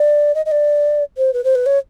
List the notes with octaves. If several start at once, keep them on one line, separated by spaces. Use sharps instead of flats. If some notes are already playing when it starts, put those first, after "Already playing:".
Already playing: D5
D#5
D#5
D5
C5
B4
C5
B4
C#5